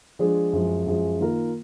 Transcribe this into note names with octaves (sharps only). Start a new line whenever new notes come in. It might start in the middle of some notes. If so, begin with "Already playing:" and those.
F3 G#3 D4 G#4
F#2 F3 G#3
F#2 F3 G#3
D#3 A#3 F4 A#4